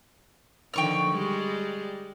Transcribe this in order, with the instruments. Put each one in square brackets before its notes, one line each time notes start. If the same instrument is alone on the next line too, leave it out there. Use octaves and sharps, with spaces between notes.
[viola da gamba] D3 D#3 F3 [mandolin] G5 C#6 F6
[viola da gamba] G3 G#3